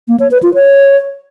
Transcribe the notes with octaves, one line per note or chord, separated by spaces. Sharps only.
A#3
C#5
B4
F4
C#5